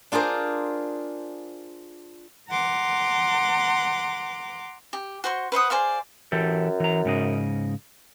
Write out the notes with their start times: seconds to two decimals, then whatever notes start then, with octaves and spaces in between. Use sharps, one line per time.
0.12 D4 F4 G#4 A#4 C5
2.50 F#5 A#5 C6 D6
4.93 G4
5.24 F#4 C5 C6 C#6
5.52 B4 C5 F#5 D#6
5.70 G#4 C5 D5 F5
6.32 F#2 E3 G4 A4
6.80 E3 A#5
7.05 G#2 C#3 D#5